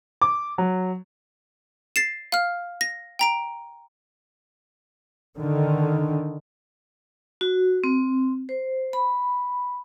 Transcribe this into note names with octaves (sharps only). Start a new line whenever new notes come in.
D6
F#3
A6 C7 E7
F5 F6
A#6
G5 A#5 D7
D3 D#3
F#4
C4
C5
B5